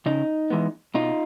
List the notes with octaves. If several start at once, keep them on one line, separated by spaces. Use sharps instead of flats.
C#3 D#4
E3 G#3 B3
B2 D#4 F4